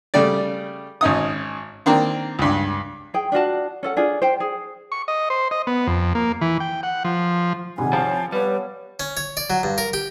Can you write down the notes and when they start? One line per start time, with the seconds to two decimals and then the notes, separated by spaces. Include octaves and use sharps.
0.14 C#3 G3 A3 D5
1.01 G#1 C#4 D#4 D#6
1.86 D#3 A#3 C4 D4
2.39 C#2 G2
3.14 G#4 G5
3.32 D4 F4 F#4 A5
3.83 C#4 A4 F#5
3.97 D4 F4 G#4
4.22 C5 G5
4.40 G#4
4.92 C#6
5.08 D#5
5.30 C5
5.51 D#5
5.67 B3
5.87 F2
6.15 A#3
6.41 E3
6.60 G5
6.83 F#5
7.04 F3
7.78 G#2 C3 D#3 G3 G#3 F#5 G#5
7.93 F3 C4 G4 A4 C#5 F5 A5 B5
8.32 G3 B3 B4 C#5
9.00 C#4
9.17 C#5
9.37 D5
9.50 F#3
9.63 G2
9.78 A#4
9.93 G4